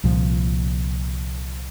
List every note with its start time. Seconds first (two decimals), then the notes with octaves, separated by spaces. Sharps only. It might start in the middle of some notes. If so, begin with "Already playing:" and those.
0.04 C2 A#2 F3